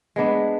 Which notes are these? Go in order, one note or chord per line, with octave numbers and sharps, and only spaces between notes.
G#3 B3 D4